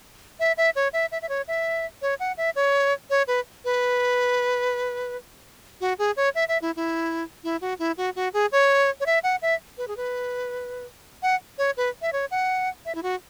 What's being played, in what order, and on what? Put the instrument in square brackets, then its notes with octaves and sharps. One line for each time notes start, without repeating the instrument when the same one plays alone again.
[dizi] E5
E5
C#5
E5
E5
E5
C#5
E5
C#5
F#5
E5
C#5
C#5
B4
B4
F#4
G#4
C#5
E5
E5
E4
E4
E4
F#4
E4
F#4
F#4
G#4
C#5
C#5
E5
F#5
E5
B4
G#4
B4
F#5
C#5
B4
E5
C#5
F#5
E5
E4
F#4